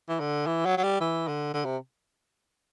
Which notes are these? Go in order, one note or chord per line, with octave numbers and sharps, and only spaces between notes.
E3
D3
E3
F#3
F#3
G3
E3
D3
D3
C3